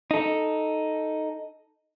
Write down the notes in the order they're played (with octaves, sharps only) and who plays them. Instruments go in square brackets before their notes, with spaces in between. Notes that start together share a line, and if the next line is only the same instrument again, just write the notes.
[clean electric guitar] D#4 A4